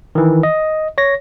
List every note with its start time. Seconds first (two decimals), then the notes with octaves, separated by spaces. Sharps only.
0.15 D#3 E3
0.43 D#5
0.98 C#5 A#6